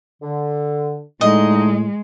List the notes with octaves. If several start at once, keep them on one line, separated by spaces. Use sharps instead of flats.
D3
A2 D3 G#3 A3 D#4 D#5